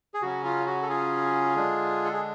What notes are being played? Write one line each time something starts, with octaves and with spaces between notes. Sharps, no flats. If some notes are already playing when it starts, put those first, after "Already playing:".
G#4
C#3 F#3 C#4 F#4
F4
F#4
A4
F4 G#4
D3 G#3 D4
A4
G#4